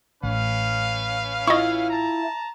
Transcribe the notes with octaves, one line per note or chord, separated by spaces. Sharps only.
A1 C#4 B4 F5
E4 F4 D#5 C#6
A5 A#5